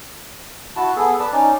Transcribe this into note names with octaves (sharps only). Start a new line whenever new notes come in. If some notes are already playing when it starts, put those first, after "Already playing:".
E4 F#4 A5
B3 G#4 A4
B4 D5 A5
C#4 D#4 D5